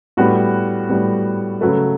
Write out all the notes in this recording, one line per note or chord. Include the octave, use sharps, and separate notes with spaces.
A2 G3 B3 F#4
A2 G3 B3
C#3 F#3 A3 B4